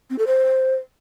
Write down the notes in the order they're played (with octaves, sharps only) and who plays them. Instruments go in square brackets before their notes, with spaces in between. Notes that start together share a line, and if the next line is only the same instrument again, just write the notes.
[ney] C4
A4
C5